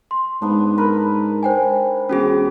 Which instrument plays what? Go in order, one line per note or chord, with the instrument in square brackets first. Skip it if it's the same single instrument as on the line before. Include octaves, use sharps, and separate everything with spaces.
[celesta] C6
[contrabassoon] G#2 [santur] B3 D4
[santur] A#4 B4 B5
[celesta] C5 G5 G#5
[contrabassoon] E1 [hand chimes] C#4 F#4 G#4